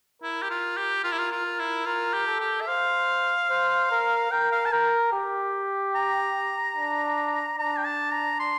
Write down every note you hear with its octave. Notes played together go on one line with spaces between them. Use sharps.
E4 A#4
G4
F4
G4
F4 A#4
E4
F4
F4
A#4
E4
F4 A#4
G4
A4
G4
E5
C5 F5
C5
A#4
A#4 G5
F5
A5
A#4 G5
G4
A#5
D4
D4 A#5
G5
A5
A#5
C6